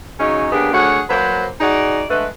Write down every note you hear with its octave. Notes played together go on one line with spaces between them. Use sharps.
C#3 F#3 C#4 D#4
C#3 A#3 B3 D4 G4
D2 G#4 C#5 F#5
F#3 A#3 B4 C5
D#4 F#4 G#4 D5
D3 G#3 A3 B4